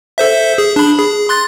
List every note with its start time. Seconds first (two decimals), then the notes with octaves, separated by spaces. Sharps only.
0.18 A4 C5 E5
0.58 G#4
0.76 D4 B5
0.99 G#4
1.29 C6 F#6 A6